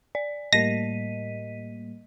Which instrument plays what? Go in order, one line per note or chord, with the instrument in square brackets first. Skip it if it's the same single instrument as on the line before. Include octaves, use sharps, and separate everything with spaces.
[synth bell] D5
[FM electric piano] A2 G3 A#3 [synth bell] D#5 B6 D#7 [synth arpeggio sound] A#6